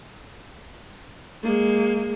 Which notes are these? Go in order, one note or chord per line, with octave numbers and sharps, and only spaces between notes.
G#3 A#3